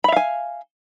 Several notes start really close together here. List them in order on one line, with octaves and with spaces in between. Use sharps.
B5 E5 F5 G#5